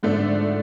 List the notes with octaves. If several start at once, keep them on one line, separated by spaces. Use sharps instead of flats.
G#2 D3 F3 A3 D4